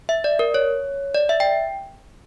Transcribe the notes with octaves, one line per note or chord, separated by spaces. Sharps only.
E5
D5
A#4
C#5
D5
E5
G5